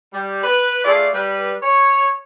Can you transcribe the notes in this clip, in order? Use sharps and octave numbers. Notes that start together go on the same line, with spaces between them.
G3
B4
A3 F4 G#4 D5
G3 B4
C#5